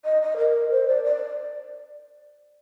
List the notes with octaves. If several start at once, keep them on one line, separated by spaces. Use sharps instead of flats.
D#5
D#5
A#4
C5
D5
D5